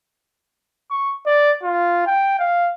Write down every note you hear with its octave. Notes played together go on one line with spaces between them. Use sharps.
C#6
D5
F4
G5
F5